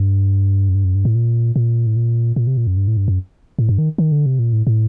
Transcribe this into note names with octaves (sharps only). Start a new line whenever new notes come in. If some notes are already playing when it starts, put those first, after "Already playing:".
Already playing: G2
F#2
G2
F#2
G2
A2
A#2
A#2
A2
A#2
A#2
C3
A#2
F#2
G2
A2
G2
F#2
A2
G2
D#3
D#3
D3
C3
A#2
A2
A2